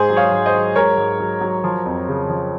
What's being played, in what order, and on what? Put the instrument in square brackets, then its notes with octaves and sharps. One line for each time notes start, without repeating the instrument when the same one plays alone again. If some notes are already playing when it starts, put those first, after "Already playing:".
Already playing: [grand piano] G#2 G#4 C5
F#3
C#5 F5
G#2
C5 D#5
F#3
G#2 A#4 C#5
G#2
F#3
F#3
F3
F2
C#3
F3